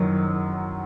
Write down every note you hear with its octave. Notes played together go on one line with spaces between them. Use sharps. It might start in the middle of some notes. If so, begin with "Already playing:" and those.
Already playing: F#2 D#3 F#3